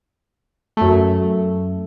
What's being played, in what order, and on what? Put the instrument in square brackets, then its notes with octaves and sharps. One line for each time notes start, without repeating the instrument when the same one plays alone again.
[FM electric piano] F#2 A3